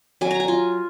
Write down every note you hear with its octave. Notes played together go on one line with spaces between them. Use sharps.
F#3 G#5
A#5
G#5
F4